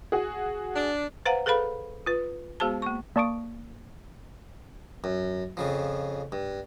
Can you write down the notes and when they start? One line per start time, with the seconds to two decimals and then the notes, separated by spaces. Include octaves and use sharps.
0.12 F#4 G#4
0.75 D4
1.26 B4 C5 F5 F#5 A#5
1.46 G#4 A4 B4 F5 B5
2.06 F4 B4
2.60 G#3 B3 F#4 G#4 C5 A5
2.82 A#3 C#6
3.16 A#3 D5 A5 C#6 D#6 D7
5.04 F#2
5.57 F2 C#3 F3
6.32 G2